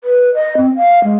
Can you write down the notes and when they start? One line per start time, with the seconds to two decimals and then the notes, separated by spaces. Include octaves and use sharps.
0.04 B4
0.35 D#5
0.57 C4
0.77 F5
1.04 G#3